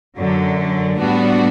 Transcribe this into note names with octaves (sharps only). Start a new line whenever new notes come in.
F#2 D3 F#3
A2 G3 B3 D4 F#4